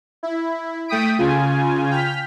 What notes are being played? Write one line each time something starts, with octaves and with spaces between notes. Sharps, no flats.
E4
A3 G5 D#6 B6 D7
C#3 F4 G#5
G5 F6 B6